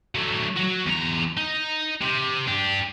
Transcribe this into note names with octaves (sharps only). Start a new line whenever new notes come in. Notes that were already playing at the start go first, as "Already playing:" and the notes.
F#3 A3
F#3 F#4
E2 A#5
D#4
C3
D4 G4